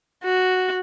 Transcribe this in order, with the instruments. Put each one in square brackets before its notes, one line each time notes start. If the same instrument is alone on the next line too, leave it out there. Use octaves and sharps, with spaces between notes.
[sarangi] F#4